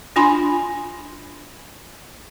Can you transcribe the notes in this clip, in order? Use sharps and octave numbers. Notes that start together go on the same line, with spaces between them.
D4 F4 G#5 B5 C6